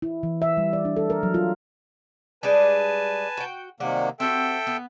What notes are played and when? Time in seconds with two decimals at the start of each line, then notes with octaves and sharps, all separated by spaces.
0.02 E4
0.23 E3
0.42 E5
0.57 G3
0.73 D5
0.85 D4
0.96 A4
1.10 A#4
1.23 F#3
1.34 F4
2.43 G3 G#3 D4 B4 G#5 A5
3.37 F#4 G5
3.80 C3 D#3 F#3 G3 A#3 F#5
4.20 C4 F#4 G4 A4 E5 G5
4.67 B3